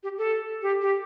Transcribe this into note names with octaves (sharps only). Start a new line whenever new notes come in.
G4
A4
G4
G4